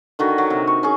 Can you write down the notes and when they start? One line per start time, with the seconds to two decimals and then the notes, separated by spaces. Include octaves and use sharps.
0.19 D3 D#3 F#4
0.38 F#3
0.50 C3
0.67 C#6
0.83 C#4 G#4